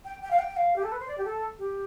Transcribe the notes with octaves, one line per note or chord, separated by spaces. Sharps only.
G5
G5
F5
G5
F5
G4
A4
B4
C5
D5
G4
A4
G4